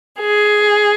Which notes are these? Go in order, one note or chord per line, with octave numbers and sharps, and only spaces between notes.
G#4